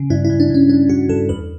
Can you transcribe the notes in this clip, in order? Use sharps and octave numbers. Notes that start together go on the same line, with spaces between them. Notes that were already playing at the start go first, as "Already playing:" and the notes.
Already playing: C#3
G2 E4
E4
G2
D4
G2 C#4
G2 D4
G2 F#4
G2 A4
E2 B4